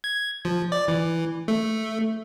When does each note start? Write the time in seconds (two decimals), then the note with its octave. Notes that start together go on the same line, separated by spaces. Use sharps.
0.04 G#6
0.45 F3
0.72 D5
0.88 E3
1.48 A3